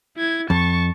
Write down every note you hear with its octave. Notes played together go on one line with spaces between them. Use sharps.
E4 G#6
F2 A5 C#6